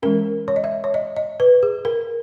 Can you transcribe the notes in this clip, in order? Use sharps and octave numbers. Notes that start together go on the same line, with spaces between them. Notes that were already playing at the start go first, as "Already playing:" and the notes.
E3 G#3 C#4 A#4
C#5
D#5
E5
C#5
D#5
D#5
B4
G#4
A#4